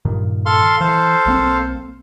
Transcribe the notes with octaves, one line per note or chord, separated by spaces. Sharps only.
G2 A#2 D#3
A4 F5 C6
E3 A4 C5 F5
B1 A#3 C4